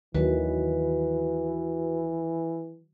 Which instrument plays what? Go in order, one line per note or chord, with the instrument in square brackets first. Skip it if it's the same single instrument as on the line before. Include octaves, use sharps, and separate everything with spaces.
[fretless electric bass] D#2 [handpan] D#3 F#3 [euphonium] E3 [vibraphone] F#4 B4